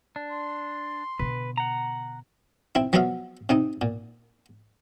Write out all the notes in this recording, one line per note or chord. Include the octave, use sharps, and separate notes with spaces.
D4
C6
B2 D3 B4
F#5 A#5
C4 E4
F3 F#3 B3 F#4 E5 F5
C3 C4 D#4
A#2